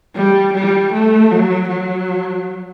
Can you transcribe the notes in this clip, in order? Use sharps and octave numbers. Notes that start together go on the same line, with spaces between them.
G3
G3
A3
F#3
F#3